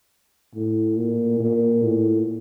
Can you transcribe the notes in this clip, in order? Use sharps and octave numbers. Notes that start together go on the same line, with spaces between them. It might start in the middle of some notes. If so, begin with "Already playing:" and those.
A2
A#2
A#2
A2